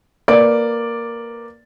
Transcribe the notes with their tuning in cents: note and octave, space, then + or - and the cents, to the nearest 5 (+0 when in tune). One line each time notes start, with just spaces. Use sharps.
A#3 +0 B4 +0 D5 +0